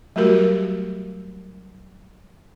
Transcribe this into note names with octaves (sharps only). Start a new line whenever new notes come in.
F#3 G3 A3 F#4 G4 A#4